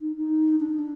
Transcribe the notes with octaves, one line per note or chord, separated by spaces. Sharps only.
D#4
D#4
D4
D#4
D4